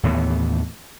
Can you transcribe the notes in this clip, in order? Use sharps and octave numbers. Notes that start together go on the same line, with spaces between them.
D#2 A2 E3 B3